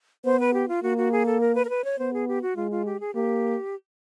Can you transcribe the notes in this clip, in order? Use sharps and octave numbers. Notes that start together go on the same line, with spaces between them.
B3 C5
B4
G4
F4
A#3 F#4
F#4
G#4
A4
A#4
B4
A#4
B4
C#5
B3 C5
G#4
G4
F#4
G#3 F4
F4
G4
G#4
A#3 G4